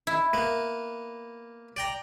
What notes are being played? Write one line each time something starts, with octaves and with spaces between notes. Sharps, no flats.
E4
A#3 B3
D5 G5 A#5